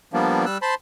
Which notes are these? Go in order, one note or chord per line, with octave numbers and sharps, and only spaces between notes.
F3 G3 A#3 B3 D4
G3 E6 F#6
C5 A5 B5 C6